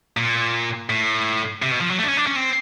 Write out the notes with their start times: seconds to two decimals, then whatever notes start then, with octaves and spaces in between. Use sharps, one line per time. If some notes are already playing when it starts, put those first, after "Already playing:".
0.17 A#2
0.90 A2
1.62 C3
1.71 B2
1.81 F3
1.90 F#3
1.98 A3
2.04 D4
2.08 C#4
2.17 D4
2.27 C#4
2.36 C4